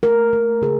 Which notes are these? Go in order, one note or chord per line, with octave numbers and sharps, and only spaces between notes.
A3 A#4
A3
C#3 G#4